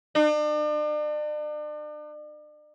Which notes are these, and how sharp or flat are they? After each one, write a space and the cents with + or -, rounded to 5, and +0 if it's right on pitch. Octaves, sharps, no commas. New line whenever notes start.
D4 +40